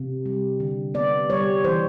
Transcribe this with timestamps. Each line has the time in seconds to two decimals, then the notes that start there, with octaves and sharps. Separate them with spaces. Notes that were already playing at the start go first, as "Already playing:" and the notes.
Already playing: C3
0.26 G3
0.60 D3
0.94 B3 D5
1.30 G3 C#5
1.64 E3 C5